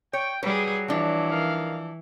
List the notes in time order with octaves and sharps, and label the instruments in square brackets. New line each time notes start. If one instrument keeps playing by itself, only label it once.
[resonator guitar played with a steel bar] C#5 [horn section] G5
[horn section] F#3 [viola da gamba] G3 G#4 [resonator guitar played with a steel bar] B4
[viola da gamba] E3 [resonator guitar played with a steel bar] F3 D4
[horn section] D#3 F5